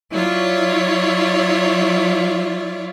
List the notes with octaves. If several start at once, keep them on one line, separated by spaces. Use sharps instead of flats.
F#3 E4 F4 C#5 D5